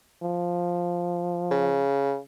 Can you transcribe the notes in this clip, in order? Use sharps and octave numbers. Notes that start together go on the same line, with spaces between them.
F3
C#3